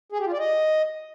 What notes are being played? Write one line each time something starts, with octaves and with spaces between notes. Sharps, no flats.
G#4
G4
F4
D5
D#5